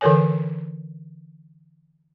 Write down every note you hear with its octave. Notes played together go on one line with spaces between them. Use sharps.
D3 E3 A4 A#4 C#5 G#5